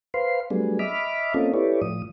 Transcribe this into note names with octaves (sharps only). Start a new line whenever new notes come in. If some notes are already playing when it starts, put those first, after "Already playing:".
B4 C5 F5 C6
F#3 G3 A3 B3 D4 G#4
D#5 E5 B5 D6 F6
A#3 C4 C#4 F4 A4 D#5
E4 G4 A4 B4 C#5 D5
A2 F3 D#6